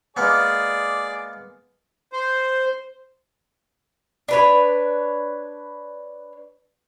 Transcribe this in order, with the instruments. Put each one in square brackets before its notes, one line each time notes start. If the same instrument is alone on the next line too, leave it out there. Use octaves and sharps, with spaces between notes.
[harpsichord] G#3 A#3 B3 [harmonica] G#4 D5
[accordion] C5
[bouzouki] D4 B4 C#5